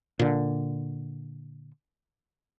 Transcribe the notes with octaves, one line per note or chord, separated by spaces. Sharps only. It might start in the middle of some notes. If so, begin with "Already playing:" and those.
A#2 D3